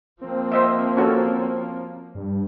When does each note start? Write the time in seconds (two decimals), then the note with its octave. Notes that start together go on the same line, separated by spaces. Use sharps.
0.21 F3 A#3 C4
0.52 C5 D#5 E5
0.97 C#4 F#4 A4
2.15 G2